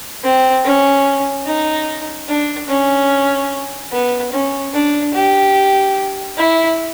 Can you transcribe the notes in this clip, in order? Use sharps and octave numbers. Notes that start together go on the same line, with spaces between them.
C4
C#4
D#4
D4
C#4
B3
C#4
D4
G4
E4